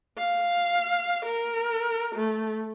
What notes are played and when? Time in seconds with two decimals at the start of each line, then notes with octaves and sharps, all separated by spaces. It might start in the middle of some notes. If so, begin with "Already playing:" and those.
0.17 F5
1.25 A#4
2.15 A3